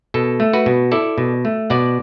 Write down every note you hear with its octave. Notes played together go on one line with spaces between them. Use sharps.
B2 A4
A3
F#4 B4
B2
E4 A4 D5
B2
A3
B2 D5 F#5